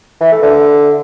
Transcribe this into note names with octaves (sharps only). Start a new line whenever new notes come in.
E3
A3
D3